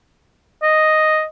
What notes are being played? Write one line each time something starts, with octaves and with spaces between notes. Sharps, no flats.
D#5